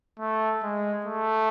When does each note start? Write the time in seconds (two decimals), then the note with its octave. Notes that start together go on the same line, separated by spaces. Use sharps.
0.20 A3
0.63 G#3
1.06 A3